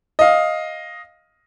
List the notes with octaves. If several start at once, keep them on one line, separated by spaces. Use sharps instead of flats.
D#5 F5